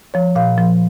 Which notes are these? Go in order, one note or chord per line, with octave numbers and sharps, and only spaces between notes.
F3 C#5
A#2 F5
F3